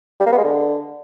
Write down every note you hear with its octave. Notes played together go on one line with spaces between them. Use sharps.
G3
A#3
B3
G#3
D3